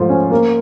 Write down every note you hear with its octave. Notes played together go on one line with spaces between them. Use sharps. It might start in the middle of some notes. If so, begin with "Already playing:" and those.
Already playing: G#2 F3 A3
C#4
A#3